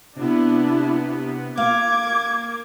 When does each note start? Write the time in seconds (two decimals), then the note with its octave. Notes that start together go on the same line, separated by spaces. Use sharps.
0.16 C3 B3 D4 E4
1.58 A#3 F5 D6 G#6